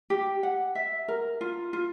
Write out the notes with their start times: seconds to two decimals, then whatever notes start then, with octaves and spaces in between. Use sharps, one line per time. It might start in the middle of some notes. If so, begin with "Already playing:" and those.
0.10 G4
0.43 F#5
0.75 E5
1.08 A#4
1.41 F4
1.73 F4